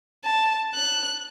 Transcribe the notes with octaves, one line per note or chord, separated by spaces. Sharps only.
A5
F#6